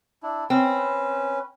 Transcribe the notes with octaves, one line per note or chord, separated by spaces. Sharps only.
D4 E4
C4 C#4 B4